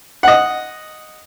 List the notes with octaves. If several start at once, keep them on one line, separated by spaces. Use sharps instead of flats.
D#5 F#5